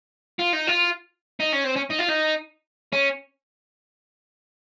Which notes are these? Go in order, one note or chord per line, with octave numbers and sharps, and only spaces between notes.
F4
D#4
F4
D#4
C#4
C4
C#4
D#4
F4
D#4
C#4